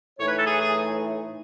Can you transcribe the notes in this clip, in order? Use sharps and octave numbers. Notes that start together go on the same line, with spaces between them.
A2 E3 A3 D#4 C#5
B4
A4
G#4
G#4